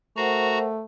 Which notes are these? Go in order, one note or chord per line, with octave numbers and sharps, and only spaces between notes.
A3 F#4 A#4 C5 F#5 A#5